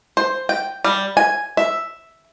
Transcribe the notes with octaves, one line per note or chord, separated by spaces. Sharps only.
C5
G5
G3
G#5
E5